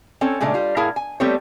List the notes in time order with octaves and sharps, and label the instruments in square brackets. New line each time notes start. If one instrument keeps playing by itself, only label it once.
[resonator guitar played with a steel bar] C4 C#4 A4 C#5
A#2 C#3 G#3 A3 D4
G3 F4
A2 E4 G#4 A#4 F5 A5
G#5
G3 A3 B3 C4 A4 C#5